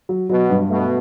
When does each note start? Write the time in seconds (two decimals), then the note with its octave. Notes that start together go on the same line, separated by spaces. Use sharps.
0.09 F#3
0.29 B2 F#3
0.50 G2
0.70 B2 A3